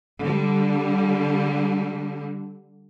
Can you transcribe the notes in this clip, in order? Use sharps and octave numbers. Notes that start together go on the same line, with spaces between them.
D3 G3